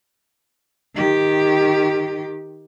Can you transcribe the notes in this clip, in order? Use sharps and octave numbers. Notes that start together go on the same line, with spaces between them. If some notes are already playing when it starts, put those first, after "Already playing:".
D#3 G4